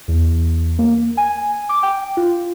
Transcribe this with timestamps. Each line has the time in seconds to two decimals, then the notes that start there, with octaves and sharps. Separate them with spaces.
0.08 E2
0.79 A#3
1.17 G#5
1.69 D6
1.83 G5
2.17 F4